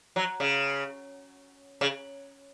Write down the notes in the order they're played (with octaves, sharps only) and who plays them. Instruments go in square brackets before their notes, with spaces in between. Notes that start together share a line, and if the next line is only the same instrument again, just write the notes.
[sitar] F#3
C#3
C#3